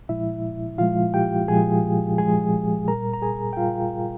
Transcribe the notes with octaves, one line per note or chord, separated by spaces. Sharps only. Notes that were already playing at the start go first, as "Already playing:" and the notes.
A#2 F3 G#3 E4 E5
A#2 F3 G#3 F4 F5
G4 G5
A#2 F3 G#3 G#4 G#5
A#2 F3 G#3 G#4 G#5
A#2 G3 A#4 A#5
A#5
G#4 G#5
G5
A#2 G3 F4 F5